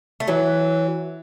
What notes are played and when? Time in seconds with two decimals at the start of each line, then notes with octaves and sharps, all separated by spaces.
0.20 A3
0.28 E3 F#3